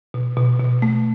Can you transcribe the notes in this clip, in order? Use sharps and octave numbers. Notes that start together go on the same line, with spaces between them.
B2
B2
B2
A3